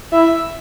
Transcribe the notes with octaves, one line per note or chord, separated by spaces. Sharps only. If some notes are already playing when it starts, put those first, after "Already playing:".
E4 E5